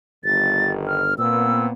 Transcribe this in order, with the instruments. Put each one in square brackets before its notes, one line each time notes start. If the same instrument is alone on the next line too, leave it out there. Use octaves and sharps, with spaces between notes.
[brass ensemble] G1 G2 D#3 [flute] A6
[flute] F6
[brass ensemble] A#2 B3 C4 [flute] E6